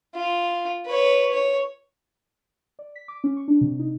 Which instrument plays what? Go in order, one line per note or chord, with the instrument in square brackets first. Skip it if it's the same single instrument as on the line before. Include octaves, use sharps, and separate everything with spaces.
[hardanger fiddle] F4
B4 C#5
C#5
[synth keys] D5
B6
D6
C#4
C#6
D4
C3
D#4